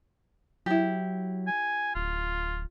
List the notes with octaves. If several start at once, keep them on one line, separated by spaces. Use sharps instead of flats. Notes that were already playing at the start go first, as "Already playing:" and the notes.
F#3 E4 G4
G#5
D1 F4